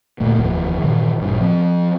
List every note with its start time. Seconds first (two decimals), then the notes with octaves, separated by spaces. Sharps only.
0.20 D2 A#2 A3 A#3
0.37 F1 D#2 E3 F3
0.82 G2 A#2 D#3 E3
1.20 A1 G2 A#2
1.41 F3 C4